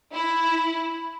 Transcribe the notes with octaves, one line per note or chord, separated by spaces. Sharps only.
E4